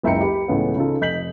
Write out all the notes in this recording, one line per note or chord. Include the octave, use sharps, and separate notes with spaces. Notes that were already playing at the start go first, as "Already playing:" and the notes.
F#1 C#2 E5 G5 A#5 C#7
G4 B5
C#2 A2 E3 B3 C#4
C#3 D#4 F4 A4
F1 D#5 G6 B6 F#7